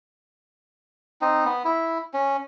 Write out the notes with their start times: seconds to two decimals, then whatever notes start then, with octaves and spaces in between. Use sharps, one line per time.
1.21 C4 D#4
1.45 B3
1.65 E4
2.13 C#4